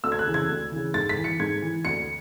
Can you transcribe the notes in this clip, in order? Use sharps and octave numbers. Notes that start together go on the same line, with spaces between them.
D2 E6
G#6
F#6
C#3 E3
G#6
D2
C#3 E3
G#2 A6
B6
E3
C#7
G#2 G#6
E3
D2 C#7